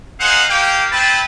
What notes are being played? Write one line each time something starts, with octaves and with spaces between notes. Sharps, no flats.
D#4 G#4 C5 F5 F#5
A#3 G4 F5 G5
C4 E4 B4 G5 A5